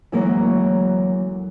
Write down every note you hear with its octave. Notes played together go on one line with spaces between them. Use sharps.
D2 E3 F#3 G#3 A#3 C#5